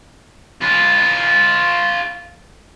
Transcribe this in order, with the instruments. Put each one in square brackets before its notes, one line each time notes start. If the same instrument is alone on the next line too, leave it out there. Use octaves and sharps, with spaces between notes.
[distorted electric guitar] F4 B4